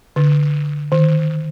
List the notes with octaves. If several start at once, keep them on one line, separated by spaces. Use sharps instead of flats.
D3
D#3